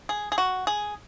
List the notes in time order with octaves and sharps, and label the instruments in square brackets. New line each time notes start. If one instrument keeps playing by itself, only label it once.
[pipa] G#4
G#4
F#4
G#4